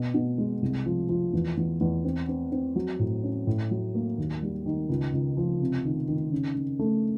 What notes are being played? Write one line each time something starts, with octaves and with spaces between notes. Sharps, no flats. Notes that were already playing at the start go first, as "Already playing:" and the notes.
Already playing: B2
B2
G#3
C2
F3
F3
E2
E2
E2
C4
C4
C4
F#3
A2
C#4
A2
F#3
A#3
D#2
G3
D#3
C#2
C#2
F3
C3
D#3
D#3
C#3
C#3
A3